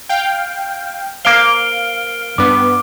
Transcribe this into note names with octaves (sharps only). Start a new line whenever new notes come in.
F5 G5
A#3 C5 F5 F6 D7 G7
G2 B3 D6